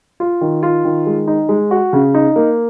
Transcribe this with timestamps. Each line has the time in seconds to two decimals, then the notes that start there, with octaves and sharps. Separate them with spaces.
0.20 F4
0.41 D#3
0.63 F4
0.85 D#3
1.06 G#3
1.28 D#4
1.49 G#3
1.71 F#4
1.93 C#3
2.14 D#4
2.36 A#3